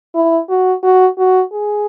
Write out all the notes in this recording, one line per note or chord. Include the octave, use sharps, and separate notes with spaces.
E4
F#4
F#4
F#4
G#4